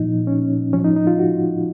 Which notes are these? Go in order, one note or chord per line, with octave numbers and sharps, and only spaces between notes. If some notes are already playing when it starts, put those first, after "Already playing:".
Already playing: A#2 F3 D#4
C#4
A2 F3 C#4
D#4
D#4
F4
F#4